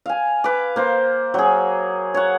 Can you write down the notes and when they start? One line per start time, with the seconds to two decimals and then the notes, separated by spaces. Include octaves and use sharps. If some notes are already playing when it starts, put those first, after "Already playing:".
0.06 F5 G#5
0.44 B4 D6
0.76 A#3 C5
1.34 F#3 G#4
2.14 C#5 F#5